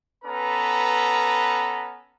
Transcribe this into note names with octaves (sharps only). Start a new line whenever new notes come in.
B3 C#4 A4 B4 A#5